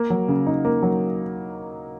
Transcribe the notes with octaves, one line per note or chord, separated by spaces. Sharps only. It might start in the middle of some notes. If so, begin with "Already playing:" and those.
Already playing: A#3
F#3
C#3
D#4
A#3
F#3